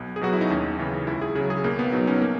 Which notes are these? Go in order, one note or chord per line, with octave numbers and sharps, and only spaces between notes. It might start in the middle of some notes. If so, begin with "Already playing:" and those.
Already playing: B1 B3
G#4
B2 F#3 F#4
E4
D#4
D#2 C#4
C#3 E3
C#2 E4
G#4
C#3 F#3 G#4
G#4
B1 A#3
B3
B2 F#3 D#4
C#4
A#3